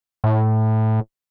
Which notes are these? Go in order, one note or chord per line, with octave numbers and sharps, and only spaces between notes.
A2